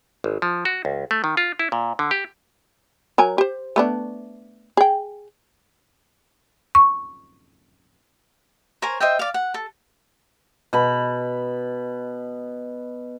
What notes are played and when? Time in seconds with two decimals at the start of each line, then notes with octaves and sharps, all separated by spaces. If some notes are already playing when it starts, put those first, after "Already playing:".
0.24 G#1
0.42 F3
0.65 F#4
0.85 C#2
1.11 A3
1.24 D#3
1.37 F4
1.59 E4
1.72 A#2
1.99 D3
2.11 G4
3.18 F#3 A#4 G#5
3.38 G4 C5
3.76 A3 B3 D4
4.77 G#4 G5
6.75 C#6
8.82 A#4 C5 C#5 G#5
9.00 C5 D#5 E5 G5
9.19 D5 F5
9.34 F#5
9.54 A4
10.73 B2 B5